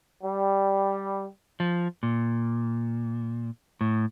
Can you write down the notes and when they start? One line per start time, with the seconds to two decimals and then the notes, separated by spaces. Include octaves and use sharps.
0.21 G3
1.60 F3
2.03 A#2
3.81 A2